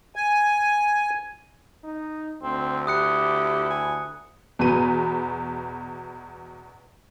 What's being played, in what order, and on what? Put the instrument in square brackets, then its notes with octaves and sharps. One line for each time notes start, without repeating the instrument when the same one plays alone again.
[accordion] G#5
[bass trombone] D#4
[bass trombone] D2 [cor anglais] C4
[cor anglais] E4 [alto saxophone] G4 [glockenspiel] D#6 F#6 C#7
[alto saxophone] G#5
[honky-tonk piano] E2 B2 B4 D#7